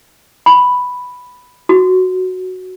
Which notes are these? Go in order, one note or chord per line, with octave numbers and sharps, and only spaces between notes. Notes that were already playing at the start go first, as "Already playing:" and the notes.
B5
F#4